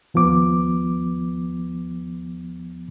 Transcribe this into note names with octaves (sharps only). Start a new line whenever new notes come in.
D#2 F3 B3 D6